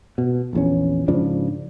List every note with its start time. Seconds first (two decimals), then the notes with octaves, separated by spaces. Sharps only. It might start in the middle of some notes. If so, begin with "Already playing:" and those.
0.18 B2
0.53 A#1 E2 C#4
1.08 G#2 C#3 F3 D4